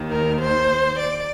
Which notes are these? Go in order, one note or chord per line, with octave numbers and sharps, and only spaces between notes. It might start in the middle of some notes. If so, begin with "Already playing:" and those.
Already playing: D#2 D#3
A#4
C5
D5